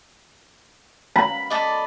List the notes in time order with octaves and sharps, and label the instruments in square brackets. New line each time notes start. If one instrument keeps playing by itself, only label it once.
[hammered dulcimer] B5
[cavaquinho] A4 D5 D#5